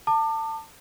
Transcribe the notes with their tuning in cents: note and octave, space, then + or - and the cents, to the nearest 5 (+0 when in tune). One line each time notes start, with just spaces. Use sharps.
A5 +25 D6 +35